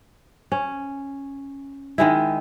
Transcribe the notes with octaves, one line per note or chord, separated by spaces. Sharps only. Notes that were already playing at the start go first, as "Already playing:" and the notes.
C#4
D#3 G#3 E4